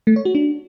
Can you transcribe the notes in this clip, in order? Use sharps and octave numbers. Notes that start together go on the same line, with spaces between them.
A3
C#5
F#4
D4